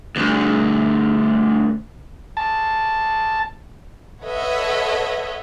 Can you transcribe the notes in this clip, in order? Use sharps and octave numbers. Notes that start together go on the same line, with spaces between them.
D2 G2
A5
A4 B4 C#5 D#5 E5 F#5